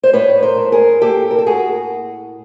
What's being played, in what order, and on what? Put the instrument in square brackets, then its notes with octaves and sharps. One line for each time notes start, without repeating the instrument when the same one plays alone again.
[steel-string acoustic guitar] C5
A2 B4 C#5
A#4 C5
A2
G#4 A#4
A#3 G4 A4
A#4
A4
A2 F#4 G#4